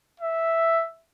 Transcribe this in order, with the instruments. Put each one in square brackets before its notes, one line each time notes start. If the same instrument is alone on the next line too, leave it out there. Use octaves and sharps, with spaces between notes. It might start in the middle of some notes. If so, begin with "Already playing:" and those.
[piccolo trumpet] E5